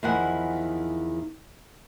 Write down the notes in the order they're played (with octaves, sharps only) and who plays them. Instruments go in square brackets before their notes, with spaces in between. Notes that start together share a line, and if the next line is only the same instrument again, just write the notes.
[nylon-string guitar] E2 D#3 F3 E4 F#5 G#5